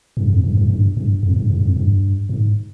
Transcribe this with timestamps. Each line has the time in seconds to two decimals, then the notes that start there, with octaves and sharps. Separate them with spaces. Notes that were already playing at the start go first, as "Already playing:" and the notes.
0.17 G2
0.30 F2
0.44 G2
0.57 G2
0.70 G2
0.97 G2
1.23 F2
1.36 G2
1.50 G2
1.62 F2
1.76 G2
2.29 G#2